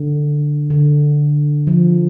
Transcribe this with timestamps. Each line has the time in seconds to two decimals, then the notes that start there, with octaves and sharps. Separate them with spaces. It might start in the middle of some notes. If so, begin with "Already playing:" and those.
Already playing: D3
0.70 D3
1.67 F3